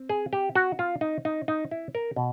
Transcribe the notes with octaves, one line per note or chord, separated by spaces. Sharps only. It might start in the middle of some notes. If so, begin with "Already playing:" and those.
Already playing: C4
G#4
G4
F#4
F4
D#4
D#4
D#4
E4
A#4
B2